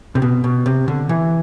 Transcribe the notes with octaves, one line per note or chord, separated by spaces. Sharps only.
C3
B2
B2
C3
D3
E3